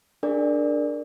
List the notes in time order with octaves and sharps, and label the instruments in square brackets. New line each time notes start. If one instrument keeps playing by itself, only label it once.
[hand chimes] D4 G#4 A#4 D5